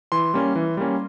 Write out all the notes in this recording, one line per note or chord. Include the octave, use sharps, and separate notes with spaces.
E3 C6
G3 A#3 C#4
E3
G3 A#3 C#4